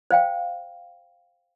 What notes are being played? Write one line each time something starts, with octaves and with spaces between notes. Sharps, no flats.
C5 F5 G5